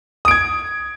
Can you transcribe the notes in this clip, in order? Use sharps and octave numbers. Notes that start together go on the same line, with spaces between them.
D#6 G#6 D7